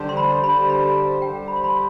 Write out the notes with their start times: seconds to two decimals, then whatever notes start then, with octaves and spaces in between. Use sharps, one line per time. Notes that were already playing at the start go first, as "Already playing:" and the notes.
Already playing: D3 G3 D4 G4 C5
0.09 C6
0.17 B5
0.43 D3 G3 D4 G4 C5 B5
0.70 B5
1.22 D3 G3 D4 G4 C5 G5
1.48 B5
1.56 C6
1.64 B5